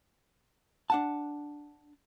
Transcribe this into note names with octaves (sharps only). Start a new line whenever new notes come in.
D4 F#5 A5